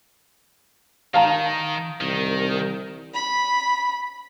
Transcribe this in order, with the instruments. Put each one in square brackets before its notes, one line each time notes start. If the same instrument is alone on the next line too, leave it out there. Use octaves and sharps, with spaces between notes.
[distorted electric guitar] D#3 [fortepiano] F5 A5 A#5
[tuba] C2 [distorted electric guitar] D#3
[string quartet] B5